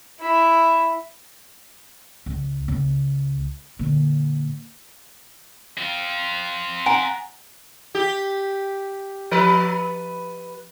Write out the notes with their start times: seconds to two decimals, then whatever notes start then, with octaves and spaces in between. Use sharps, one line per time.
0.20 E4 E5
2.26 C#2
2.68 C#2
3.79 A#2 D3
5.78 C4 F4
6.86 F#5 G#5 A#5
7.95 G4
9.31 F3 B4